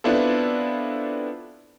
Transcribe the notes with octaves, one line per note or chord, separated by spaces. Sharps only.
B3 C4 D4 E4 F4 A4